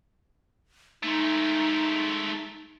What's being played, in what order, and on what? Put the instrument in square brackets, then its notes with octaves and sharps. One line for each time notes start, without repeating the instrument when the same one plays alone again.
[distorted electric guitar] G#3 A3 [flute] D#4